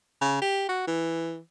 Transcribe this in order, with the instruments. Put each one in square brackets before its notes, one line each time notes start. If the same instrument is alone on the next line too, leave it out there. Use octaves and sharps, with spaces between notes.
[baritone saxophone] C#3
G4
F#4
E3